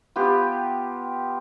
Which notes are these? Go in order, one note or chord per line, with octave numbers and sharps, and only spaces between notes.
B3 F4 G4